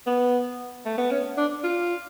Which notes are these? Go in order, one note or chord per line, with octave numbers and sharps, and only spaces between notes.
B3
A3
B3
C#4
D4
F4